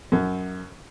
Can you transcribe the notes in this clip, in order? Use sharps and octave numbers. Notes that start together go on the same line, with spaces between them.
F#2